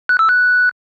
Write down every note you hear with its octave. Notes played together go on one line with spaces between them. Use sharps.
F#6
E6
F#6